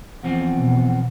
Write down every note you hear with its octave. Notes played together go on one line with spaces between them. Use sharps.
E2 F3 C4 F#5
B2